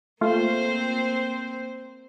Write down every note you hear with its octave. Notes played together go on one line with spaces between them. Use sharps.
A3 A#3 C4 F4 C5